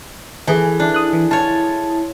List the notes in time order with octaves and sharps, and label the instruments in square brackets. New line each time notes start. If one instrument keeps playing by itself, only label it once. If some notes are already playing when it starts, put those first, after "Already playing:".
[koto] E3 [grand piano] G#4 A4 G#5
[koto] D4 [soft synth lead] E4
[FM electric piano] D#6 F#6
E3
[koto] F4 C#5 [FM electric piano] A5